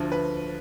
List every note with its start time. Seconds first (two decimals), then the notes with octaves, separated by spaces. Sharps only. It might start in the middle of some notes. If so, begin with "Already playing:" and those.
Already playing: D2 D3 F3
0.12 B4